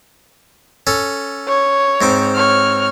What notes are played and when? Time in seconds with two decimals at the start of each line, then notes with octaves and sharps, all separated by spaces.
0.87 C#4 A4
1.48 C#5
2.01 G#2 C4 D6
2.36 C#5 F6